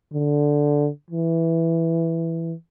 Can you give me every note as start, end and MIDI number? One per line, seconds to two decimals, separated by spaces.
0.14 0.89 50
1.11 2.54 52